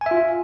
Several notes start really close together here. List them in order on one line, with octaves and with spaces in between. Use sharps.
G#5 E5 F4